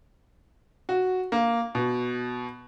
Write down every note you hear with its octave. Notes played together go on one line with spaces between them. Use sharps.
F#4
A#3
B2